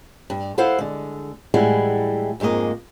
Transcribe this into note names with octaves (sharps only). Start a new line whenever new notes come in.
G2
E4 A4 C5 F5 F#5
D3 G#3
A2 E3 G3 G#3 E4 F#5
F2 G#2 G#3 A#3 D#5